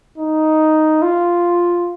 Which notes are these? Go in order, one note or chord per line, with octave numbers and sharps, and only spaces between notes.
D#4
F4